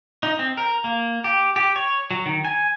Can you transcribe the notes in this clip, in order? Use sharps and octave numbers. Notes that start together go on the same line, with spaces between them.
D#4
C4
A#4
A#3
G4
G4
C#5
F#3
D#3
G#5